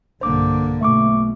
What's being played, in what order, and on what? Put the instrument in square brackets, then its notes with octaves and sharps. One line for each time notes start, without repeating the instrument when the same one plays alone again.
[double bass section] B1 G2 [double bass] D3 A#3 [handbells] C5 D6
[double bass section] B1 B2 [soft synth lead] A3 [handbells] E5 C#6 D6